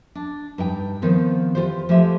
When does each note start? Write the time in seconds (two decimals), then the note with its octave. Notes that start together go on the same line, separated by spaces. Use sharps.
0.15 D4
0.58 G2 D#4 G5
1.02 D#3 F3 B3 C4
1.55 E2 B2 F4 G4 C5
1.89 F3 G#3 A3 G4 E5